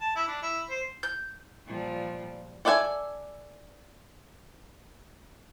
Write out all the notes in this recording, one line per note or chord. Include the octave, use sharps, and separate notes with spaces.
A5
E4
D4
E4
C5
G6
A#2 F3 G3
A4 D5 E5 F#5 G#5